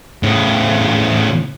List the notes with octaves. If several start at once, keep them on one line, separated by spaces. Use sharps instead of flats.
A2 C#3